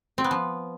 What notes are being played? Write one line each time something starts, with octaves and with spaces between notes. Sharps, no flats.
C4
B3
F3